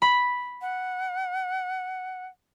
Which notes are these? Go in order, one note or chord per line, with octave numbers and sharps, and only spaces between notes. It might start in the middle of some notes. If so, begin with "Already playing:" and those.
B5
F#5